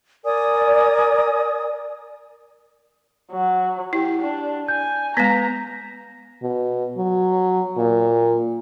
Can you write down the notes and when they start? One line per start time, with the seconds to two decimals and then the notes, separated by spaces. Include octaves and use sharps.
0.24 A#4 D5 G#5 D#6
3.32 F#3
3.93 E4 G4
4.22 D4
4.68 G#5 G6
5.17 G#3 B3 B4 A#5 A#6 B6
6.43 B2
6.97 F#3
7.78 A#2